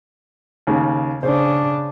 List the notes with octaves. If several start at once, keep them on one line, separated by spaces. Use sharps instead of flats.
D#2 C#3
C#3 D4 C5